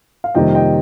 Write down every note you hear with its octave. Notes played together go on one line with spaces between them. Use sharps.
F5
F2 C3 D#3 G3 A#3 D#5 G5
D#5 G5